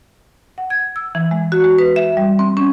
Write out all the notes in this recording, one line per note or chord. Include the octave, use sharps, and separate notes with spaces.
F#5
G#6
E6
E3
G#3
F#4
G#3
B4
E5
G3
C4
C#4